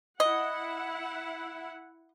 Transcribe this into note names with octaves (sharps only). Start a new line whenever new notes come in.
E4 D#5 F#5